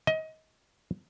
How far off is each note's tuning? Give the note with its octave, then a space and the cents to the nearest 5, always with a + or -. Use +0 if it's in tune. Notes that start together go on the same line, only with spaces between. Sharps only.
D#5 +25